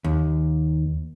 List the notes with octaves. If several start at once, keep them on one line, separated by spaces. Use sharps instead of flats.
D#2